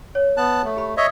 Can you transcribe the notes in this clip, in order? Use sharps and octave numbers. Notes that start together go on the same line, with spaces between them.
C#5
B3 A5 F#6
A3
G4 B5
C#5 D#5 E5